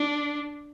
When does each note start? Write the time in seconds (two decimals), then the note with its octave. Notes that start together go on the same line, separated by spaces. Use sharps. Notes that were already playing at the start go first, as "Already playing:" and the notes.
Already playing: D4